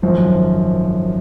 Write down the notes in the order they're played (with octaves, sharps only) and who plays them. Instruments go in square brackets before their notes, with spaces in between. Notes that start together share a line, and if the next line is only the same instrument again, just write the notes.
[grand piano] G#1 F#2 F3